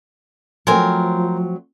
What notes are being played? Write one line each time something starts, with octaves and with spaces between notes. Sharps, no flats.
F3 F#3 A3 C4 A#4 C5 G#5